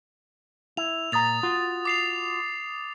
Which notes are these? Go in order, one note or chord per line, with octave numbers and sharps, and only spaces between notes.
E4 F7
A#2 A#5 D#6 A6 F7
F4 F#4
D6 C7 F7